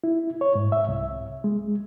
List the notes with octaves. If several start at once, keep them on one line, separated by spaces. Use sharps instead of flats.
E4
C#5
G#2
E5
C2
G#3